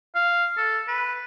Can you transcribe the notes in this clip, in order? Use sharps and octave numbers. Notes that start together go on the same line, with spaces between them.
F5
A4
B4